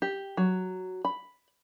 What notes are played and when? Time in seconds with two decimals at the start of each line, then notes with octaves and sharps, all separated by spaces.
0.02 G4
0.37 F#3
1.05 B5